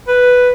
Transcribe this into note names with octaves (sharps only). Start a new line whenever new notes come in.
B4